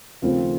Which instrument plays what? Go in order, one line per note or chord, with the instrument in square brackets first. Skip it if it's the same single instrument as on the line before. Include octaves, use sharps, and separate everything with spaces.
[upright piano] D#2 C#3 F3 A3 C4 F4